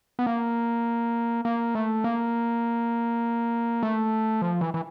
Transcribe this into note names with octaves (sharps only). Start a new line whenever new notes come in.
B3
A#3
A#3
A3
A#3
A3
F3
E3
E3